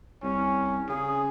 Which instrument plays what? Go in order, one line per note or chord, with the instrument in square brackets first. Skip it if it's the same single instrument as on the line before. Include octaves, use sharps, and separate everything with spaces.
[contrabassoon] C2 [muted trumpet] C#4
[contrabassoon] C#3 [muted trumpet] G#4